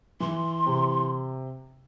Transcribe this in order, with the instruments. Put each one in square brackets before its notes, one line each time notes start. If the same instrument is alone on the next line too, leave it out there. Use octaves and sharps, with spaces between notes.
[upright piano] E3 [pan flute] C6
[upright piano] C3